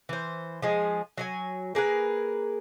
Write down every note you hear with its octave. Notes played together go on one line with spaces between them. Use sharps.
E3 C5
F3 G#3 G#4
F#3 D#5 G#5
A#3 G#4 A#4 B4